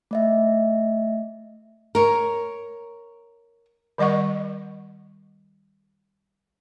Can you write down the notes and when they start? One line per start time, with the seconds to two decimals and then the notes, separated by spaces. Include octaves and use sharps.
0.11 A3 D#5 E5
1.95 A#4 C#5
3.98 D#3 G3 D#5 F#5 C#6